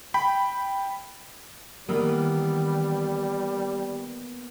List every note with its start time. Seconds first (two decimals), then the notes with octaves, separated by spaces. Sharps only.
0.14 G5 B5
1.89 D#3 E3 G3 A#3 B3 F6